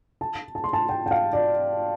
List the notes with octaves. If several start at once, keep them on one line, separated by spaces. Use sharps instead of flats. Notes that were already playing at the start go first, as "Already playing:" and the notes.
A5
A5
C6
A5
G5
G5
F5
D5